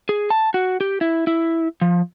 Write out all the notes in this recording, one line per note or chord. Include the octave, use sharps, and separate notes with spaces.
G#4
A5
F#4
G4
E4
E4
F3